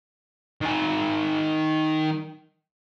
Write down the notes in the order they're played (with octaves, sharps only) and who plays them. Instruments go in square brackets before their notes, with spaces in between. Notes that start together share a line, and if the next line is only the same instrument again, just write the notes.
[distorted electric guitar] D#3 G#5